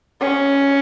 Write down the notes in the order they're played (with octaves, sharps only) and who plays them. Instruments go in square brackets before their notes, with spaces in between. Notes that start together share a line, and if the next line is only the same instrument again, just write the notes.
[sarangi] C#4